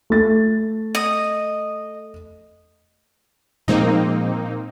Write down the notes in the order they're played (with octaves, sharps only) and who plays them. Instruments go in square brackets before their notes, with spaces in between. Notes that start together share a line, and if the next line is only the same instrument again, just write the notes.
[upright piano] A3 A6
[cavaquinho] D#5
[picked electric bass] A#2 F3 G#3 [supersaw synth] A#3 C4 D#4